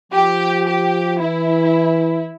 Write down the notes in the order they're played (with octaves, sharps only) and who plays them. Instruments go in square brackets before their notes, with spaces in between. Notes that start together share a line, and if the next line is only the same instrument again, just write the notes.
[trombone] F3 [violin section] G4
[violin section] G4
[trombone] E3 [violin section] E4